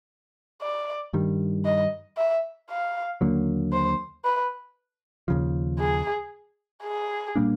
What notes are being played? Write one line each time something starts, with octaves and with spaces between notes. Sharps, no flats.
D5
G2 D#3 G3
D#5
E5
F5
D#2 D3 F#3 A#3
C5
B4
D#2 C#3 F3
G#4
G#4
A#2 G3 A#3 D4